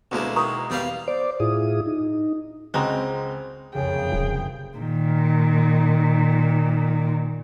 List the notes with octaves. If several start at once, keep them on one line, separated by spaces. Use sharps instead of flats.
D2 B2 G#3 A#3 E4 F#4
D#3 A#5 C#6 D#6
E2 G3 B4 F5
C5 D5 D6
A2 E4 F4 G#4 D#6
D#4
C#2 G#3 C4 F#4 A#5
F#1 C2 F2 C#3 G#4 G5
D#1
A#2 D#3